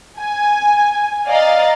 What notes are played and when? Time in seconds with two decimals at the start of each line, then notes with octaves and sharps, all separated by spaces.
0.19 G#5
1.27 D5 D#5 F5 A#5 A6